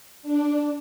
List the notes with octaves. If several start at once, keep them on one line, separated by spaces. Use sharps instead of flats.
D4